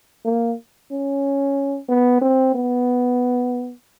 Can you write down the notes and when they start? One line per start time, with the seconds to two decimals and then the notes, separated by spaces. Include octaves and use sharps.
0.25 A#3
0.91 C#4
1.89 B3
2.22 C4
2.55 B3